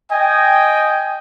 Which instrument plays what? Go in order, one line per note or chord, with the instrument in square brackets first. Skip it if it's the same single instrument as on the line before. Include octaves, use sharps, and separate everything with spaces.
[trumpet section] D#5 G5 G#5